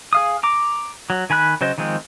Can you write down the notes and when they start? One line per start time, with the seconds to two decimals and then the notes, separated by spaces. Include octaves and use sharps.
0.13 G#4 F5 D#6
0.43 A#5 D6
1.10 F#3
1.30 D#3 G#5 B5 F#6
1.61 C#3 F#3 C5 D#5
1.78 D#3 F3 G#3 C4